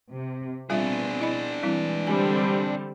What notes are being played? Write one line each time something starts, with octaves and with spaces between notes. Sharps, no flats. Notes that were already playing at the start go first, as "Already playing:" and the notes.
C3
G3 B3 C4 D4 F4 G#4 E5
E4 D#5 B5
E3 G3 G#3 C4 E4
D3 G3 C4 G#5